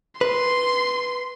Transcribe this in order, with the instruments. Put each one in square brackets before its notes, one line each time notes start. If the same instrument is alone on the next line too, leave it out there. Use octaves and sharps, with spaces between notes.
[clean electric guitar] B4 [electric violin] C6